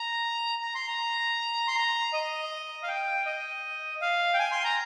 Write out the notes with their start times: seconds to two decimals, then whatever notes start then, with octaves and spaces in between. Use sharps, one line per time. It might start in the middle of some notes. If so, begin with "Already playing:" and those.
Already playing: A#5
0.62 A#5
0.75 C6
0.88 A#5
1.68 C6
1.76 A#5
2.13 D#5
2.83 F5
2.88 G5
3.26 D#5
4.02 F5
4.34 G5
4.39 G#5
4.52 C6
4.64 A#5